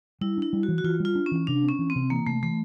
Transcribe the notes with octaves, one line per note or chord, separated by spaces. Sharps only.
G3 E4
D4 E4
G3
F#4
E3
F#4
E3 F4
G3
F4
D4
C#4
E3
C3 D4
C4
C#4
E3
C4
C3
E3 A#3
C3 A3
E3 A3